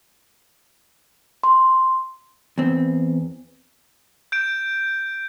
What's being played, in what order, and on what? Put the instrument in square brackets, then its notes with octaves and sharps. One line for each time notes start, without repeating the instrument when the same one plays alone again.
[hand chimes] C6
[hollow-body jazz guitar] E2 C4
[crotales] G6 D7